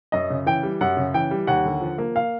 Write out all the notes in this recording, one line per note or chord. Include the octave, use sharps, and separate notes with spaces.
F#2 D#5
C#3
E3 G5
G3
F#2 F#5
C#3
E3 G5
G3
D#2 F#5
D3
F3
A#3
F5